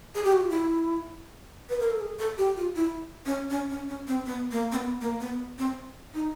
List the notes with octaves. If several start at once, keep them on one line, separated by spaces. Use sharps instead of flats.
G#4
G4
F#4
F4
E4
B4
A#4
A4
G#4
A4
G4
F4
E4
C#4
C#4
C#4
C#4
C4
B3
A#3
C4
B3
A#3
B3
C4
D#4